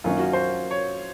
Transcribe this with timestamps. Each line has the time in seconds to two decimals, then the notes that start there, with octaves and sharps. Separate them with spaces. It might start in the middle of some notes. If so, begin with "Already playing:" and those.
0.04 F#2 D#3 A#3 C#4 F4
0.19 F#4
0.33 C5
0.71 C#5